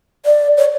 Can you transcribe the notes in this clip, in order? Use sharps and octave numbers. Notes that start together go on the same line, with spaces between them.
D5
C#5